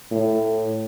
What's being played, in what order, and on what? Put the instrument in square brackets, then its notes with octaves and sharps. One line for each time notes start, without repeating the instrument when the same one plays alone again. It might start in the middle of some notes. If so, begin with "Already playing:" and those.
[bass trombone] A2